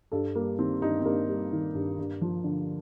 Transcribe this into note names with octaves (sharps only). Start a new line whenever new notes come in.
G2 A4
G3 A#3
D#3 C4
G2 D#4
C4
G2 A#3
G3
D#3
G2
G2
F3
D3